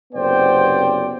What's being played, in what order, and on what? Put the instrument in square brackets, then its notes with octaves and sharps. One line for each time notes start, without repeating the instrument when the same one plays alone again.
[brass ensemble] F#1 C3 B3 C5 D5 G5